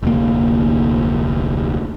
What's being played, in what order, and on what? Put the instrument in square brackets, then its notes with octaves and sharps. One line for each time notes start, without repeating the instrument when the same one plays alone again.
[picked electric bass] F1 D2 A#3